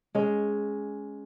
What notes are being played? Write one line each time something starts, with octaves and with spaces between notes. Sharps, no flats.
G#3 C#4 G#4